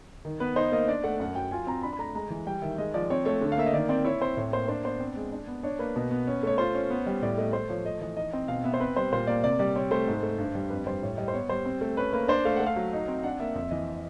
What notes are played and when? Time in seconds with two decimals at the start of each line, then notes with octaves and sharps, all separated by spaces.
0.25 D#3
0.40 B3 B4
0.56 D#4 C5
0.72 A#3 D#5
0.88 D4 D5
1.04 A3 F#5
1.20 F#2 F#5
1.35 F#3 G5
1.51 F4 G#5
1.67 C4 A#5
1.83 D4 B5
1.93 B5
1.99 A3 A#5
2.15 G#3 A#5
2.30 E3
2.47 G3 G5
2.62 D#3 E5
2.78 G#3 D#5
2.94 F3 D5
3.10 C4 C#5
3.25 A3 C#5
3.41 D3
3.52 F5
3.58 A#3 E5
3.66 D#5
3.73 D#3 D5
3.89 C4 D5
4.05 E4 C#5
4.21 C4 C5
4.37 A2 C#5
4.53 A#3 C5
4.68 D4 C5
4.84 B3 C5
5.00 C4
5.16 G#3
5.32 D4
5.48 B3
5.63 D4 C#5
5.79 A#3 B4
5.96 B2
6.11 B3
6.27 C#4
6.43 A3 C#5
6.58 F4 C5
6.75 C#4
6.90 B3
7.06 G3
7.22 A2 D5
7.38 A3 D#5
7.53 A3 C5
7.69 F3 C#5
7.85 A3 D#5
8.01 E3 D#5
8.17 D#4 D#5
8.33 C4 D#5
8.48 B2 F5
8.64 B3 E5
8.74 C5
8.80 C4 B4
8.96 G3 C5
9.12 A#2 C5
9.27 A#3 D5
9.44 C3 D5
9.59 G3 D5
9.76 C4 C#5
9.91 A3 C5
10.07 G#2
10.23 A3
10.38 G2
10.55 G3
10.70 F2 B4
10.86 G3 C5
11.02 A2 C#5
11.18 G3 D#5
11.28 C5
11.34 B3 C#5
11.49 G3 C5
11.65 C4
11.81 A3
11.97 C#4 B4
12.13 A#3 B4
12.28 D4 C5
12.45 A3 F5
12.56 A3 F#5
12.66 F5
12.76 F#3
12.93 D#4
13.08 C4
13.23 D4 F#5
13.40 A#3 E5
13.55 F2 E5
13.71 E3 D#5